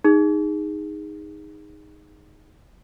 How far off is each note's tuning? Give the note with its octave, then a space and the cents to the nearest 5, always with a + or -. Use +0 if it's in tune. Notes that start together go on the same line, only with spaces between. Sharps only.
D#4 +0 G#4 -20